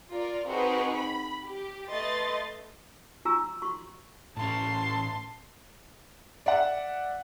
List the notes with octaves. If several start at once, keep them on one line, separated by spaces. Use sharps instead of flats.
F4 A#4 D5
C4 D#4 F#4 G#4 A#4 B4
B5
G4
A3 B4 D#5 C6 A6
F4 F#4 G#5 A#5 C#6 E6
F#4 C6 C#6
A2 C#4 A5 C6
D5 E5 F#5